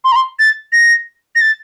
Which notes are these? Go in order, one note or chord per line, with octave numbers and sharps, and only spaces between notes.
C6
A#5
C6
A6
A#6
A#6
A6